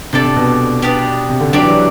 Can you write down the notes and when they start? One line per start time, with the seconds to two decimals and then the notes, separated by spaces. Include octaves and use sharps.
0.13 C3 D4 A4 D5 A5
0.24 C3
0.36 B2
0.82 B3 D4 G4 D5
1.29 C3
1.40 D3
1.52 F#3 D4 G4 D5
1.61 E3
1.70 F#3